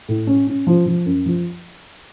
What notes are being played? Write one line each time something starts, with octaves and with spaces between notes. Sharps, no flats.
A2
C#4
C#4
F3
F3
F#2
F3